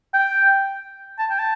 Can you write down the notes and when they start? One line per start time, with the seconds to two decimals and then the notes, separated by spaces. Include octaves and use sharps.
0.14 G5
1.19 A5
1.30 G5
1.39 A5